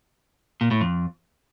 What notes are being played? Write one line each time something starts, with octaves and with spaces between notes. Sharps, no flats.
A#2
A2
F2